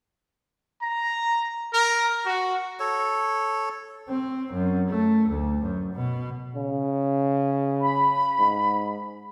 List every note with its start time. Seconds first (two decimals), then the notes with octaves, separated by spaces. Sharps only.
0.82 A#5
1.73 A#4
2.26 F#4
2.80 A4 C#5
4.09 C4
4.53 F#2
4.88 A3
5.29 D2
5.62 F#2
5.94 B2
6.55 C#3
7.82 B5
8.39 G#2